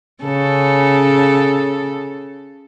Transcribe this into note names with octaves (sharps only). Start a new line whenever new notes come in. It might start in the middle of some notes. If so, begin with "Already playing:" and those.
C#3 A4